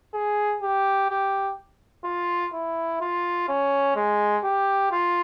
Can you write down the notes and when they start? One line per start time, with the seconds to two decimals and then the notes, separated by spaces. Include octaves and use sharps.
0.14 G#4
0.63 G4
1.10 G4
2.05 F4
2.53 E4
3.01 F4
3.48 C#4
3.96 G#3
4.44 G4
4.92 F4